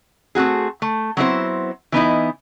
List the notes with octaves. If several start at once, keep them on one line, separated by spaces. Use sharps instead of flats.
A3 C4 F#4 G#4
A3
F#3 B3 C4 D4 E4 C5
E3 B3 D#4 E4